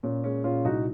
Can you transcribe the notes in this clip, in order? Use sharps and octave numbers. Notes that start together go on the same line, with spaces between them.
A#2 C#4
G#3 C#4
A#2 C#4 F4
C2 D#4 F#4